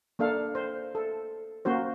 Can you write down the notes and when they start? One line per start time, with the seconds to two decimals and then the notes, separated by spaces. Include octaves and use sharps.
0.19 A#3 D4 A4 F5
0.55 C5
0.95 A4
1.65 A#3 C#4 F#4 C5